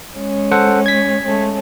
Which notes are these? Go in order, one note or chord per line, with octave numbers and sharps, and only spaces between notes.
G#3 C#4
A4 C5 F#5
G#6 B6
G#3 A3 C#4